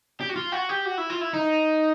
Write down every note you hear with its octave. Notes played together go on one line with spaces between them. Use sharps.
G4
F#4
F4
F#4
G4
F#4
E4
F4
E4
D#4